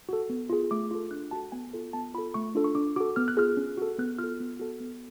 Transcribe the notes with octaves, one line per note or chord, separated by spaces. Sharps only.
F#4 A4
B3
F4 G#4
A3 D6
F4 A4
D4 F#6
F#4 A4 A5
B3 G#5
F4 A4
B3 A5
F4 A4 B5
A3 C#6
D4 F4 A4
C#6
D4 D6
F#4 A4 D6
B3 F6
F#6
F4 G#4 F6
C#4
F#4 A4
B3 F#6
F4 F6
A4
B3
F#4 A4
B3